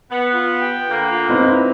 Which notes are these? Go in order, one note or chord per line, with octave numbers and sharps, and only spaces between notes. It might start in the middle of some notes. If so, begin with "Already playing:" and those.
B3 F#5
F4
G5
D3 A#3
F4
C4 D#4 E4 B4